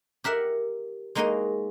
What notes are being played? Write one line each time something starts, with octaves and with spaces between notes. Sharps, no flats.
G4 A#4 E5 F#5
G#3 A#3 D#4 F#4 D#5 G5